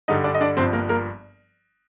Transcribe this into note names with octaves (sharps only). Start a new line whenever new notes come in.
G2 D3 G3 D#4 D#5
D4 D5
D#5
D4 D5
G1 G2 F3 C4 C5
A#3 A#4
A#3 A#4